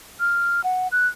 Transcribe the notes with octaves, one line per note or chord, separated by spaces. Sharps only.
F6
F#5
F#6